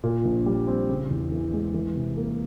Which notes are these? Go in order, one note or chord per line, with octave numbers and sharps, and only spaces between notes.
A#2
A#1
G3
C4
C#3
E2
E3
G#3
E3
C3
A#3